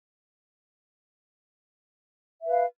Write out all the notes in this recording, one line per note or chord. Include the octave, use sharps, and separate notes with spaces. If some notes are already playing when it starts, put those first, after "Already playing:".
B4 E5 F5